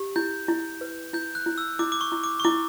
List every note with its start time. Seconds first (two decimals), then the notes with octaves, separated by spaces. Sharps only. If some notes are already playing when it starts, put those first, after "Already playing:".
Already playing: G4
0.16 E4 G6
0.48 E4
0.81 B4
1.14 E4 G6
1.35 F#6
1.46 E4
1.58 E6
1.79 E4 D6
1.92 D6
2.01 C#6
2.12 E4
2.24 D6
2.40 C#6
2.44 E4 D6